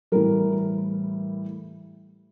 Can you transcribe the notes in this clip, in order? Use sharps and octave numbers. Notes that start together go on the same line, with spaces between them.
A2 E3 G3 A#4